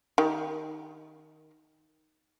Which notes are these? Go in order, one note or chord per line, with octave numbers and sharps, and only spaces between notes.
D#3 G4